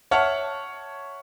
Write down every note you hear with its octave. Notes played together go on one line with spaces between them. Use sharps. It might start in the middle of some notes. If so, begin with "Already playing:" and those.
C#5 E5 F#5 A5 C#6 F6